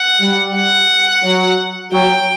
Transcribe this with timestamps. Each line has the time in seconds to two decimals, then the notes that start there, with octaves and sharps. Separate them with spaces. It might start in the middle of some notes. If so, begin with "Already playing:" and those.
Already playing: F#5
0.21 G3
0.55 F#5
1.23 F#3
1.92 F#3 G5